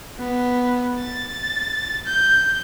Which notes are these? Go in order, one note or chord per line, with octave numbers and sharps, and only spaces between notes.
B3
A6
G6